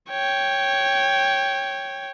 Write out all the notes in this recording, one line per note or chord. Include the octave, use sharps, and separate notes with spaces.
C#5 G5